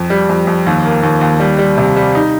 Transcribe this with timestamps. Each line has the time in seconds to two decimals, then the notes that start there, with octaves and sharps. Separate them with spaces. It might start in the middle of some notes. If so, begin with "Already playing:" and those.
Already playing: F2
0.10 G3
0.29 F2
0.47 F2
0.66 D#2
0.85 A#3
1.03 D#2
1.21 D#2
1.40 G3
1.59 G3
1.78 C3
1.97 G3
2.15 D#4